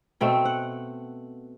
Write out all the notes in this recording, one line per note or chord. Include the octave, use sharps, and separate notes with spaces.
B2 A3 C4 G5
F#5